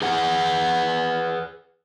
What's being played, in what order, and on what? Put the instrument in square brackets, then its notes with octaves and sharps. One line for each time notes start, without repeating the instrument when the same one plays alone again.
[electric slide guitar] G#4 B4 F#5